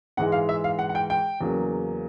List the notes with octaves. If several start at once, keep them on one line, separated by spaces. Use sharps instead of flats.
G#2 E3 G#3 F#5
F5
E5
F5
F#5
F#5
G5
G5
E2 C#3 F#3 A#3